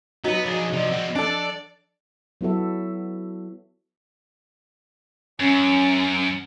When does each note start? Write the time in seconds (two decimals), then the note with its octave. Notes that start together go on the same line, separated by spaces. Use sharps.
0.24 F#3 B3 D#4 B4
0.46 F3 D4 G#4
0.73 C3 F3 D5 D#5
0.92 C4 F#4 F#5
1.15 D4 A4 D5
2.41 F#3 B3 E4 F#4 A4 E5
5.40 F#2 C#4